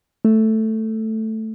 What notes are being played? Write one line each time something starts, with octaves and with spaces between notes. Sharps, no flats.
A3